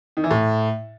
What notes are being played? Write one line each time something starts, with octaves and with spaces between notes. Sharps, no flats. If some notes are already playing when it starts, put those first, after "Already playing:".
D#3
E3
A2